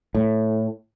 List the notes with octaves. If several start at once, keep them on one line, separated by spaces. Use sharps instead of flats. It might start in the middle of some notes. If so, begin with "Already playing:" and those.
A2